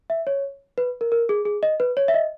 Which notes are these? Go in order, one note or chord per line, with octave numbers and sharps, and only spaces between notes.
E5
C#5
B4
A#4
A#4
G#4
G#4
D#5
B4
C#5
E5
D#5